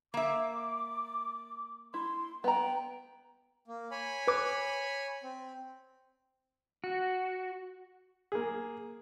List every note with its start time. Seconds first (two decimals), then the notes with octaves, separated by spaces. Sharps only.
0.14 A#3 E5 D6
1.94 E4 C6
2.44 B3 G5 A#5
3.68 A#3
3.91 C#5 G#5 B5
4.27 B4 D6
5.23 C4
6.84 F#4
8.32 A#3 G#4